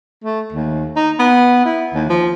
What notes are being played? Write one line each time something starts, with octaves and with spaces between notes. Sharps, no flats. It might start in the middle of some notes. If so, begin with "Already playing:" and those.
A3
D#2
D#4
B3
E4
D#2
F3